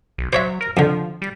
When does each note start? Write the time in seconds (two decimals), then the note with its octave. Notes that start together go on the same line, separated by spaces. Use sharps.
0.18 B1
0.33 F#3 C5 C#5 E5
0.61 A#4
0.77 F2 D3 F3
1.22 G3